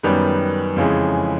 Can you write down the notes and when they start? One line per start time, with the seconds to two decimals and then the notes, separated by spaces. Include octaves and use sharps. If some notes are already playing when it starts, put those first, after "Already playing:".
0.03 F#2 D#3 G3 B3
0.76 F2 C#3 E3 G#3